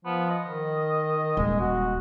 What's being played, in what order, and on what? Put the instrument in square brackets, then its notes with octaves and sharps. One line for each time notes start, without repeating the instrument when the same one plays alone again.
[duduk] F3 [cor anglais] B3
[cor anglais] D#5
[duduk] D#3
[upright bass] D#1 [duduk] G#3
[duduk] F#4